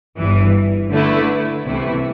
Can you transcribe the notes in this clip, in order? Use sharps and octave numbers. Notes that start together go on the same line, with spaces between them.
G1 G2 E3
D3 A3 E4 B4
C2 C3 E3 A3 E4